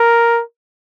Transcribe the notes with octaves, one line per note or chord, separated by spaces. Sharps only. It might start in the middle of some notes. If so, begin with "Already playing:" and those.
Already playing: A#4